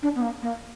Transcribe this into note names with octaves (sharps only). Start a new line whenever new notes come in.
D4
B3
A#3
A#3